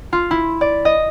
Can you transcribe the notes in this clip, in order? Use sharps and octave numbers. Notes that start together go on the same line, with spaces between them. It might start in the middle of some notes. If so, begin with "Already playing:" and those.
F4
E4
D5
D#5